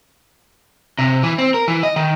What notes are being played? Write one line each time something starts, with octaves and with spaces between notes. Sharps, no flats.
C3
E3
C4
A#4
E3
D#5
D#3